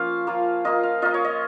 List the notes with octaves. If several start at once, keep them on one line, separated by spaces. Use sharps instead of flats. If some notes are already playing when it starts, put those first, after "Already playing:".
Already playing: F3 A#3 C#4 F4 F5
A#3 F4
A#3 F4 D#5
F5
A#3 F4 D#5
C#5
D#5